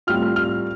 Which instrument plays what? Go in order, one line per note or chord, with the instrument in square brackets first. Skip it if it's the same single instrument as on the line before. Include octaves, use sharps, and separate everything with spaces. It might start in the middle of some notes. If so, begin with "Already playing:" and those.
[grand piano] A2 G3 C4 F4 F6
F6